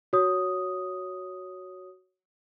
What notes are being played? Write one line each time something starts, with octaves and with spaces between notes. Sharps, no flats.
F#4 C#5 D#6